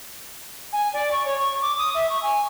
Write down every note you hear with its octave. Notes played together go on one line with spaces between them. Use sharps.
G#5
D5
C#6
C#5
C#6
D6
D#6
E5
C#6
G#5